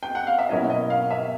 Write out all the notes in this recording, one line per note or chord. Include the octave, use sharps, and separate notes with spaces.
G5
F#5
F5
E5
B2 F#3 A#3 C#4 E4 D#5
D#5
F5
E5